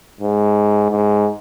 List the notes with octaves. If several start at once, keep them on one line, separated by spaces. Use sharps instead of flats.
G#2
G#2